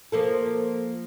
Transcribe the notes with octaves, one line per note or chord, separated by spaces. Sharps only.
F3 A#3 A4